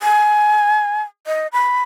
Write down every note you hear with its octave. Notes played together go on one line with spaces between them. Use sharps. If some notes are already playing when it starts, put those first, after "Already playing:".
G#5
D#5
B5